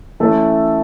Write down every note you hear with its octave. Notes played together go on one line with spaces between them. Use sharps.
E3 A3 C#4 A4